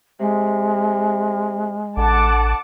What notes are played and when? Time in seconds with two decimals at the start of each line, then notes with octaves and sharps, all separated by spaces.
0.20 C3 G#3
1.97 A1 D3 F#5 A5 D6